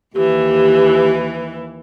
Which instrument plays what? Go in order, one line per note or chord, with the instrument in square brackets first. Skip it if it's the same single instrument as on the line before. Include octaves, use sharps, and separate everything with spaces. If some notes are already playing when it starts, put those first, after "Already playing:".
[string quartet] D#2 E3 [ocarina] G4